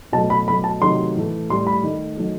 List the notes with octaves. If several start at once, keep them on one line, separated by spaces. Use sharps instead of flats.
B2 F#3 A3 A5
B5
B2 F#3 A3 B5
A5
C3 D#3 F#3 A3 C6
A2 E3 A3
A2 G3 C6
B5
D#3 A3
D#3 F#3 A3